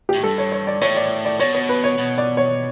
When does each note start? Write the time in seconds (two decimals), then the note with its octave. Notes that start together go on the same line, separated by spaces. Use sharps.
0.09 G4
0.14 A2
0.23 G2 A4
0.38 C#5
0.52 C#5
0.67 D5
0.81 A2 C#5
0.97 D5
1.25 D5
1.40 B2 C#5
1.55 C#5
1.69 B4
1.84 C#5
1.98 B2
2.18 D5
2.37 C#5